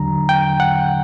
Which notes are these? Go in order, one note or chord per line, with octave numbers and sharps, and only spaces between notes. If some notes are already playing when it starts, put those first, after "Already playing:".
Already playing: E2 D3 F#3 A#5
G5
F#5